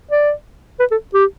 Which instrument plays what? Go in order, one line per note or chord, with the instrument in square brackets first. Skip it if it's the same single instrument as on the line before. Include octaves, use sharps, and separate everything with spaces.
[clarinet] D5
B4
A4
G4